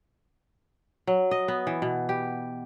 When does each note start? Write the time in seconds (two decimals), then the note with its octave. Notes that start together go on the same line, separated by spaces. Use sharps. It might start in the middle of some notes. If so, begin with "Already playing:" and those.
1.07 F#3
1.31 D#5
1.48 B3
1.67 E3
1.82 B2
2.09 G4